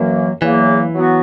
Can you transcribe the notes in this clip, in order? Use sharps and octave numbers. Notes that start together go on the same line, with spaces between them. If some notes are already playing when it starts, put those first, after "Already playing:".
Already playing: F#2 E3 F#3 A#3
E2 C#3 E3 F#3 A#3
F#3 B3 F#4